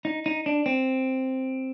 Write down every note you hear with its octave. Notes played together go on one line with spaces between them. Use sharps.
D#4
D#4
D4
C4